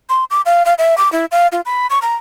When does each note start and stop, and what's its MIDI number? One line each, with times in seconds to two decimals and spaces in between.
0.09 0.24 84
0.31 0.41 86
0.46 0.63 77
0.66 0.74 77
0.78 0.97 76
0.98 1.11 86
1.12 1.26 64
1.32 1.47 77
1.52 1.61 65
1.66 1.87 83
1.90 1.99 85
2.02 2.16 82